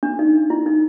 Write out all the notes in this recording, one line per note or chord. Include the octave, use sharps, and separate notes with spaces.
D4
D#4
E4
D#4